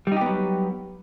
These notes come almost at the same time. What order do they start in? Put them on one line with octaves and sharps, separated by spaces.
G3 D#4 G4 B3 F#3